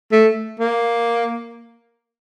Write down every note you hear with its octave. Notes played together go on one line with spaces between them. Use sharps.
A3
A#3